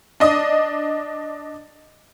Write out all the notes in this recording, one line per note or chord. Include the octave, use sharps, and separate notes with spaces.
D4 D#5 D#6